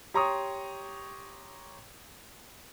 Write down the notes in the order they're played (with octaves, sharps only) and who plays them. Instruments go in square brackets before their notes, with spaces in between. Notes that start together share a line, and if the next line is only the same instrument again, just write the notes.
[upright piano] G4 C#5 A#5 C6 C#6 D#6